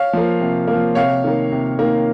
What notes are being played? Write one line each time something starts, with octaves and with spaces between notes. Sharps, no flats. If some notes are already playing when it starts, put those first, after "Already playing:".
Already playing: C#5 F5
F3 A#3
C3
A#3
F3
C3 C#5 F5
D#3 A#3
C3
D#3 A#3